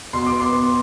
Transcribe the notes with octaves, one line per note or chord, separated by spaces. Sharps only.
B2 C6
D6
B3
C6
B3